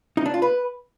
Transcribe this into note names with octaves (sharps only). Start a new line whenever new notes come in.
D#4
D4
F4
B4